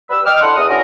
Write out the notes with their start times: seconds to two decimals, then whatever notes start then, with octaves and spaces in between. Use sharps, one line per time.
0.10 G3 B4 E6
0.26 D#5 G5 D6 F6
0.41 D4 E4 A4 C5 F#5
0.56 E2 D#6
0.69 D3 C#4 E4 F#4 A#4